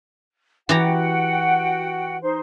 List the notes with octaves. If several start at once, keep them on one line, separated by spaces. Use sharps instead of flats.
E3 F#4 G4 F#5 G5 A#5
D#4 C5 C6